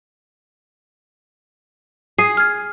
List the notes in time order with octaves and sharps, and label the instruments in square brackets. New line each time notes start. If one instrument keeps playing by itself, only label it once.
[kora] G#4 [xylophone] C7
[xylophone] F6 G#6